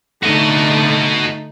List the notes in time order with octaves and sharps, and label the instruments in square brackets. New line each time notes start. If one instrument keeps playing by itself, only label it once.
[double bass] D3 [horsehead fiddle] A3 D#4 [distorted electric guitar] F#4 D#5